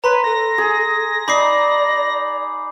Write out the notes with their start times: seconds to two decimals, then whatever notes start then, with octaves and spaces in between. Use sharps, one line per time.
0.04 B4 C#5 A#5 C6
0.24 A4 A#6
0.58 G#4
1.28 D#4 D5 B5 D6 C7